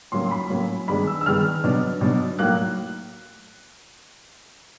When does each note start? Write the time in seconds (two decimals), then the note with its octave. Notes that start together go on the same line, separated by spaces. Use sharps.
0.12 A2 F#3 A#3 C#4 C6
0.26 C6
0.31 B5
0.50 A2 F#3 A#3 C#4
0.88 G2 D#3 G#3 B3 D4 B5
1.07 E6
1.21 E6
1.26 G2 D#3 G#3 B3 D4 F6
1.64 B2 F#3 B3 D4
2.01 B2 F#3 B3 D4
2.39 A2 F#3 A#3 F#6